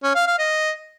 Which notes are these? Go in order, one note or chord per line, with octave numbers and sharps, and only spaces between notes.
C#4
F5
F5
D#5